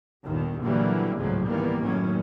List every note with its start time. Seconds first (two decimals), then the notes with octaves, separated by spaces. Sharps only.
0.25 G1 D#2 A#2 D#3
0.63 A#2 D3 E3 F#3 G3 A#3
1.15 G#1 C#2 A2 C#3 F3 F#3
1.47 D#3 E3 G3 A#3 B3
1.84 F#2 A2 D#3 C#4